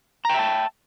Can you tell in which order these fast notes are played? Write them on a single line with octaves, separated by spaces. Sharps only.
A#5 G5 E5 A5